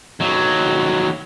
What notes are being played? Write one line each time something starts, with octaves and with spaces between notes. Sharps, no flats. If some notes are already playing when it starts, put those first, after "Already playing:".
D#2 F#3